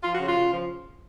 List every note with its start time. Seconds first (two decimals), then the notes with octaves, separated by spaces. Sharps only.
0.03 F3 F4
0.14 F#4
0.20 C#3
0.26 F4
0.36 C#3
0.53 F3